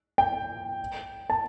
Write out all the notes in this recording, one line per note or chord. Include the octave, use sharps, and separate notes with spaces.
G5
A5